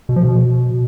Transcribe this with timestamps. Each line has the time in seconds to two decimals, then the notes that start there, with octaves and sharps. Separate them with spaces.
0.09 B2
0.16 F3
0.24 B2